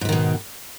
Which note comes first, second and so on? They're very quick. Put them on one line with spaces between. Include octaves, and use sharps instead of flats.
G#2 E3 D#3 B2